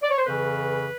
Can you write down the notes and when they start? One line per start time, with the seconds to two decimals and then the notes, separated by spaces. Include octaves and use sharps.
0.03 D5
0.11 C#5
0.18 C5
0.25 F2 C#3 E3 B4